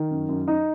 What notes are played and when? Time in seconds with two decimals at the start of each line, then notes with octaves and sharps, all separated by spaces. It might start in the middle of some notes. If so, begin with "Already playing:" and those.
Already playing: D#3
0.11 F#2
0.29 F#2
0.48 D#4